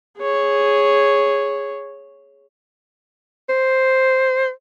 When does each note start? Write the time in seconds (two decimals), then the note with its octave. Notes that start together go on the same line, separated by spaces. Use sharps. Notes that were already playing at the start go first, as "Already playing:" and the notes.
0.18 G#4 C#5
3.49 C5